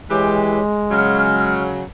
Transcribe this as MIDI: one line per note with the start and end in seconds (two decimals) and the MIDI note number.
0.10 0.59 52
0.10 1.77 56
0.10 0.59 67
0.10 0.60 73
0.91 1.83 49
0.91 1.83 54
0.91 1.60 89